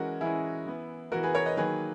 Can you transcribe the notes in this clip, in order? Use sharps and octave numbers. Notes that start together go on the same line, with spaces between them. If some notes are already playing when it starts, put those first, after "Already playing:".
Already playing: E3 G#3 C#4 F#4 A#4
E3 G#3 C#4 E4 G#4
E3 B3
E3 B3 F#4 A#4
G#4 B4
A#4 C#5
B4 D#5
D#3 F#3 A#3 G#4 B4